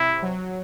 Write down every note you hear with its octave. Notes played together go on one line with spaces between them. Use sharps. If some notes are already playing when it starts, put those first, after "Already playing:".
Already playing: C3 E4
F#3